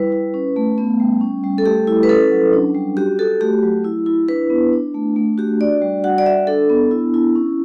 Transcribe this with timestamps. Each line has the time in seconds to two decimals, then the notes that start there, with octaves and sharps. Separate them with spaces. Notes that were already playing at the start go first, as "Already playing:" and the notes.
Already playing: G3 E4 B4
0.12 E4
0.34 C#4
0.56 A3
0.78 B3
1.00 G3
1.21 C#4
1.44 G3
1.58 A4
1.66 A3 G4
1.87 E4
2.03 B4
2.09 C#4 A4
2.32 F#3
2.53 D4
2.75 G3
2.97 F#4 G4
3.19 F#4 A4
3.41 A3 G4
3.63 F#3
3.84 E4
4.06 E4
4.28 D4 B4
4.50 B3
4.73 D4
4.94 A3
5.16 A3
5.38 F#4 G4
5.60 D4 D5
5.82 G3
6.04 F#4 F#5
6.18 D5
6.26 F#4 E5
6.47 D4 A4
6.70 B3
6.91 E4
7.14 E4
7.35 C#4